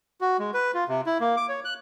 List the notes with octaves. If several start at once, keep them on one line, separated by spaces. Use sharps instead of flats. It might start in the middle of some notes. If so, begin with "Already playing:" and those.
F#4
G#3
B4
F4
C3
E4
A#3
D6
C#5
F#6